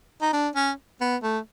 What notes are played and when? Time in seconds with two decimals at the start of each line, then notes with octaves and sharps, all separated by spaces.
0.22 D#4
0.33 D4
0.55 C#4
1.01 B3
1.23 A3